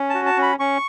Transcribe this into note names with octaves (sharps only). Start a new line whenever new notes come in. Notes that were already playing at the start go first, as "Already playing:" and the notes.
Already playing: C#4
F#4 A5
A5
C#4 B5
C#4 C#6